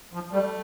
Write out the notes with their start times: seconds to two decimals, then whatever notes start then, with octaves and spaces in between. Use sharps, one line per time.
0.13 F3
0.33 G3 A3